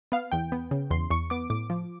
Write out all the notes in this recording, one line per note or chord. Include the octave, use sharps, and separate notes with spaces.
B3 F5
E2 G5
B3
C#3
E2 C6
E2 C#6
B3 D6
A2 D6
F3